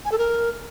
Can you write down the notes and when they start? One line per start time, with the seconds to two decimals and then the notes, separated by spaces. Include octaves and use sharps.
0.05 G#5
0.12 A4
0.18 A#4